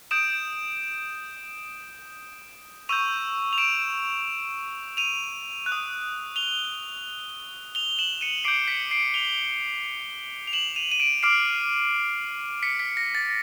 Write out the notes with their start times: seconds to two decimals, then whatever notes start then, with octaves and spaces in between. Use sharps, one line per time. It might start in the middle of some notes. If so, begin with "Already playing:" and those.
0.11 D#6 G6 D7 E7
2.89 C#6 E6 G6 D#7 F7
3.53 F7
3.58 D7 E7
4.97 D#7 F7
5.66 F#6
5.72 D#6
6.36 F7 G7
7.75 F7 G7
7.98 E7 F#7
8.21 C#7 D#7
8.44 D6 G6 C7 D7
8.68 B6 C#7
8.91 C7 D7
9.14 F7 G7
10.47 F7
10.53 E7 F#7
10.76 D#7 F7
10.92 D#7
11.00 D7 E7
11.23 D6 F6 C7 D7
12.63 B6 C#7
12.80 B6
12.97 A#6
13.15 A6